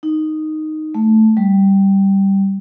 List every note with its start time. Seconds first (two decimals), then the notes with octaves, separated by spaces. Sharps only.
0.03 D#4
0.95 A3
1.37 G3